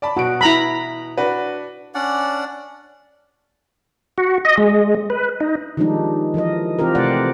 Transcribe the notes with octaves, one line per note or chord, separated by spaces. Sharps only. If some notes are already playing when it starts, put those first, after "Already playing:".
D5 A5 B5
B2 F#4 D7
E4 A#5 B5
D4 F#4 B4
C#4 D4 D5 F#5
F#4
D#5
G#3
B4
D#4
D#3 F3 G3 G#3 D4 D#4
E3 F3 A#4 D#5
E3 C4 F4 G4 A#4
C3 A3 C5 D5 F#5